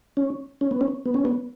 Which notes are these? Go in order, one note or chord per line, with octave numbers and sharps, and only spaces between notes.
C#4
C#4
B3
C#4
B3
C#4
B3